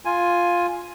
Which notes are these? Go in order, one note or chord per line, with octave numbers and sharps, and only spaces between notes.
F4 G#5